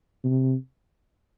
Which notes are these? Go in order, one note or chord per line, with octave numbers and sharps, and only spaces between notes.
C3